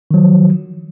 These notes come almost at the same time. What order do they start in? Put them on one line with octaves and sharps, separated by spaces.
D#3 F#3 F3